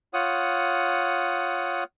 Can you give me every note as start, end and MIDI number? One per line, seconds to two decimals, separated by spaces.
0.14 1.84 65
0.14 1.84 73
0.14 1.84 78
0.14 1.84 87